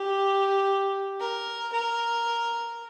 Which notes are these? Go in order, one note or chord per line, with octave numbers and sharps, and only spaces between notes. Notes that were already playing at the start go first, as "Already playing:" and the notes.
Already playing: G4
A#4
A#4